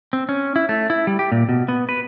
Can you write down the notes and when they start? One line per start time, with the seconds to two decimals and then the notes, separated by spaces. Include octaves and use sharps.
0.13 C4
0.29 C#4
0.56 E4
0.69 A3
0.90 E4
1.07 G3
1.19 G4
1.32 A#2
1.49 B2
1.68 B3
1.89 B4